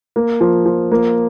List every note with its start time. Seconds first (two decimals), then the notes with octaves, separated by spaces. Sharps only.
0.16 A#3
0.41 F3
0.66 F3
0.92 A#3